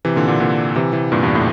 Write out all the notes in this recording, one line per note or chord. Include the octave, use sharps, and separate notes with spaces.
C3 E3
A#2 D3
A#2 D3
A#2 D3
C3 E3
C3 E3
G2 A#2
E2 G2
A2